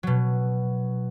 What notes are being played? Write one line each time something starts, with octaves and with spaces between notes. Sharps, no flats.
B2 F#3